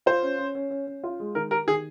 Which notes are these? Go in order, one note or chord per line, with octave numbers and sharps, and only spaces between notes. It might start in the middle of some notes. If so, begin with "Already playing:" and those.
F4 C5
C#4
C#4
C#4
C#4
C#4
F4
G#3
D#3 A#4
G4 A#4
D#3 G#4